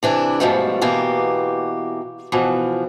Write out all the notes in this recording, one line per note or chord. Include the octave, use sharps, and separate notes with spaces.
C3 E3 D4 E4
G#2 B2 F3 G3 A3
B2 E3 A#3 G4
B2 E3 F3